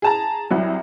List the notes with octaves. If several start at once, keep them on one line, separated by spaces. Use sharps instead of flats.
G#4 A5 A#5
C2 F#3